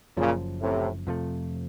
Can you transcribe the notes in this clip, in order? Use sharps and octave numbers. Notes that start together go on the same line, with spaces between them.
F#1 F#2 A#2 C#3 F3
A2 C3
F2 C3 F3 A3